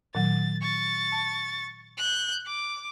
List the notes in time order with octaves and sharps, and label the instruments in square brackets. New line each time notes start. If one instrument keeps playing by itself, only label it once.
[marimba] A#2 D#3 F#3 [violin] A6
[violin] C#6 A6
[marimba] A5
[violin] F#6 G6
D6